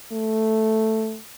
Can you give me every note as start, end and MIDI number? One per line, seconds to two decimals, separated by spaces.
0.12 1.18 57